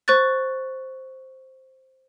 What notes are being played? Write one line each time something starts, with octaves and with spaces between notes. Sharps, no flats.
C5 C#6 F#6 A6